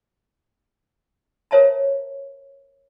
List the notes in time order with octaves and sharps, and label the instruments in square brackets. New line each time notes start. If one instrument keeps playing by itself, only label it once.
[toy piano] A#4 C5 C#5 E5 A5 A#5